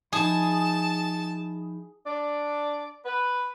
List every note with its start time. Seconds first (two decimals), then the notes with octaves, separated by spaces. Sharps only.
0.13 F3 D#4 E4 G#4 A5
2.06 D4 D5
3.05 B4